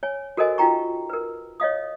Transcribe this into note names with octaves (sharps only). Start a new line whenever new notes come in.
C#5 G#5
F#4 A4 A#4 C5 D#5 G#5
D#4 F4 F#4 G5 A#5 C#6
A#4 B4
C#5 D#5 F5 D#6